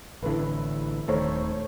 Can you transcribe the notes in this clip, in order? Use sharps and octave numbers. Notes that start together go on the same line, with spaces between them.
A1 D3 E4 A4 B4
D#1 D#3 A3 A4 C5 C#5